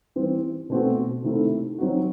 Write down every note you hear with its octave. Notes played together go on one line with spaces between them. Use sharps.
E3 G3 C4
B2 A3 C4 F#4
C3 D#3 A3 E4
F#3 C4 D#4 F#4